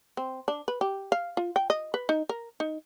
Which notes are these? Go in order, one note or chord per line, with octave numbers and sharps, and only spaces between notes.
C4
D4
B4
G4
F5
F4
G5
D#5
B4
D#4
A#4
D#4